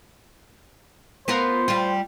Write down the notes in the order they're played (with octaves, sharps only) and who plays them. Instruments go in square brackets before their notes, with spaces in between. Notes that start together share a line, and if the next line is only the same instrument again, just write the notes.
[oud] B3 F4 A#4 [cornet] C5
[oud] G3 F4